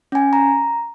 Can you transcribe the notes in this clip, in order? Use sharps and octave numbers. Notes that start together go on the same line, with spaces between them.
C#4 G#5
A#5